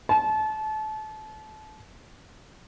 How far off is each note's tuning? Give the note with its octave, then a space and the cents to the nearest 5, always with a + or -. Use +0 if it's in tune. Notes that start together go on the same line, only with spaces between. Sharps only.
A5 -30